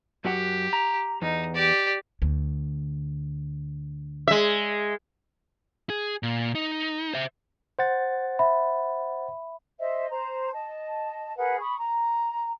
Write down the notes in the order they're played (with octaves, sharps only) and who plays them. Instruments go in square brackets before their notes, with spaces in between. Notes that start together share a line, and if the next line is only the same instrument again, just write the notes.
[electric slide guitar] F#2 F#4 F#5 [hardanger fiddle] G4
[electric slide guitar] A#5
[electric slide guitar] E2 [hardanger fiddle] D#4
[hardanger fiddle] G4 D5
[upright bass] D2
[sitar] G#3 E5
[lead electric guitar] G#4
A#2
D#4
C5 E5
[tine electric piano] C5 F#5 A6
[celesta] E5 B5
[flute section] C5 D#5 E5
C5 A#5
D#5 A5
G#4 A#4 B4 F#5
B5 C#6 D#6
A#5